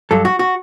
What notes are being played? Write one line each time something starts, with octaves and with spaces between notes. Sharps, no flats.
G2 F#3 A4
F#4
F#4